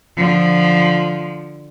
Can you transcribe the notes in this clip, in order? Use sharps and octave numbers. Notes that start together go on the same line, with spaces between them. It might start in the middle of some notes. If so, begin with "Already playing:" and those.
D3 F3